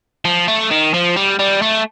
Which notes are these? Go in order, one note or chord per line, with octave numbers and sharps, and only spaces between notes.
F3
A3
D#3
F3
G3
G3
A3